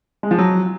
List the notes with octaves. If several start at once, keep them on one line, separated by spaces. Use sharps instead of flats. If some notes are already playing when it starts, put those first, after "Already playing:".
G#3
F3
F#3